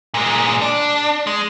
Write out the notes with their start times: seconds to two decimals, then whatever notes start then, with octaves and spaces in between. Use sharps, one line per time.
0.14 A#2 G#3
0.61 D4
1.27 G#3